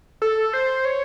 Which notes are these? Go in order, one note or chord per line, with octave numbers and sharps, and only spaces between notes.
A4
C5
C#5